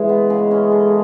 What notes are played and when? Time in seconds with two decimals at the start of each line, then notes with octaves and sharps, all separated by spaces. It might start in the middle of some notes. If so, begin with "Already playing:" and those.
Already playing: E3 G#3
0.09 B3
0.30 C#3
0.51 C#4
0.72 A4